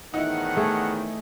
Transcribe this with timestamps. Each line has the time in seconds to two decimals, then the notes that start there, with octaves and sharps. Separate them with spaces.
0.14 E2 A2 D#3 D#4 E4 F#5
0.57 A3 G#4